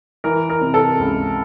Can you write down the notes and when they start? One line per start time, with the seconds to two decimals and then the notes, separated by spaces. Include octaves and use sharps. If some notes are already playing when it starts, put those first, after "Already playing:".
0.24 E3 A#4
0.50 A#4
0.61 C3
0.74 A4
0.99 C#2